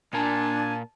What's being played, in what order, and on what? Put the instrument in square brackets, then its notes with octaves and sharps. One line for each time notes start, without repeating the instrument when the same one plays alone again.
[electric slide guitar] A#2 A#4 [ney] D4 [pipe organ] G#5 [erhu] A5